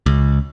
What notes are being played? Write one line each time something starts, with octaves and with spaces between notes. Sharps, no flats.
C#2